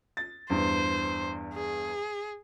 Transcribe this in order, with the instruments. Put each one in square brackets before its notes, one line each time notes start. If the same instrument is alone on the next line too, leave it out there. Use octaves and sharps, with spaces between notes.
[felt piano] A6
[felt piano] E2 G2 [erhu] C5
[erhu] G#4